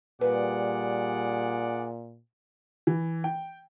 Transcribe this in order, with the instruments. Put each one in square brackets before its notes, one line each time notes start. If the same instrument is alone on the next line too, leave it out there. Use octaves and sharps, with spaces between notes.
[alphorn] A#2 [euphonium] G3 [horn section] G#4 D5 F#5 [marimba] B4
[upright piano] E3
G5